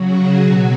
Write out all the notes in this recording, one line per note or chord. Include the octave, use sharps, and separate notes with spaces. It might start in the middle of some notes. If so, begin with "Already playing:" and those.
Already playing: C#3 F#3 F#4
G#4
B2 F#3 F#4